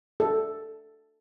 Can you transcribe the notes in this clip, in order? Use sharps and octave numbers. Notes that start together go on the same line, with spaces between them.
A4